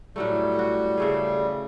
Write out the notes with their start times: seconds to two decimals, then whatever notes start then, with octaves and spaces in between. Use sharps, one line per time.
0.16 A2 F#3 G3 A3
0.35 C#4
0.59 F#4
0.98 C#3 A3 G#4